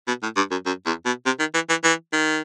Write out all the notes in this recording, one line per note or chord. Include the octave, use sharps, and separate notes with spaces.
B2
A2
G2
F#2
F#2
E2
B2
C3
D#3
E3
E3
E3
D#3